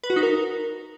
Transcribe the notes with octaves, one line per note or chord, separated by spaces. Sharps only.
B4
F#4
D#4
A#4